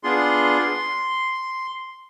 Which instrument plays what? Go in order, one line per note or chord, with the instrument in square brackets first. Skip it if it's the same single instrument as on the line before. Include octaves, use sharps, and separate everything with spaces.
[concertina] B3 D4 F4 G#4 C6